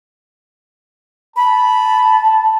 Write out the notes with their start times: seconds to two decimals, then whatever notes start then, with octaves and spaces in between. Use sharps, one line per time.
1.36 A5 B5